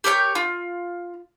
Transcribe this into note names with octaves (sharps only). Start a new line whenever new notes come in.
G4 A#4 C#5 G6
F4